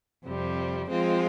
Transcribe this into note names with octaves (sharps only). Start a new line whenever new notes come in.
F2 C3 G3 C4
F3 G#3 C4 F4